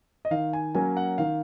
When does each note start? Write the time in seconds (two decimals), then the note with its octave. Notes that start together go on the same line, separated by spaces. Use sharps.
0.25 D#5
0.31 D#3 F5
0.53 G#5
0.75 F#3 A#3 C#4 G#5
0.97 F#5
1.18 D#3 F5